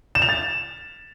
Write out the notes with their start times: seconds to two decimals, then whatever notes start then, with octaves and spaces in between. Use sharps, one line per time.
0.15 E7
0.22 F7
0.29 A6